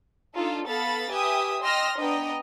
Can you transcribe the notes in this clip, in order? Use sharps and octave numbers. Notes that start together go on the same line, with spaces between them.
D4 D#4 F4 A4
B3 A4 F5 B5 A6
G4 B4 E5 G5 G#5 D#6
D#5 G5 C6 E6 F6 A#6
B3 D4 D#5 G5 A#5